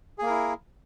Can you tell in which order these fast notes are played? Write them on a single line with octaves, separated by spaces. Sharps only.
G#4 A#3 A#4 E4